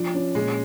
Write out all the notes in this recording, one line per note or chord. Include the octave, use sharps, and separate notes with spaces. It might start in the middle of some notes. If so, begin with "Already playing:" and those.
Already playing: F3 D4
C#4
A#2 G#3